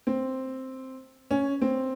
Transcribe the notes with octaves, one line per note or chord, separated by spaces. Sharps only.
C4
C#4
C4